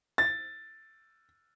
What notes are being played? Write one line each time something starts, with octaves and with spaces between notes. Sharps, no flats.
A6